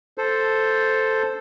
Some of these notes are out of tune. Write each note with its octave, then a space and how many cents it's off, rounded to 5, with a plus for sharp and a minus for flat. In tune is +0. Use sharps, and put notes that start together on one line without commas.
A4 +0 C5 +0